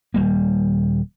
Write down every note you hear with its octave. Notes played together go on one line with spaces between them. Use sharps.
D#1 G3 A#3